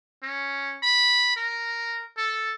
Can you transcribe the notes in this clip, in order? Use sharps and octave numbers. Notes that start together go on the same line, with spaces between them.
C#4
B5
A#4
A4